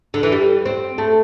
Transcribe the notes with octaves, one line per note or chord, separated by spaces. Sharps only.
D3
E3
G3
C4
A3